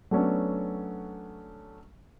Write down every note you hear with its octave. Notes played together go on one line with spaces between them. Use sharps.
F#3 A3 B3 C#4 D4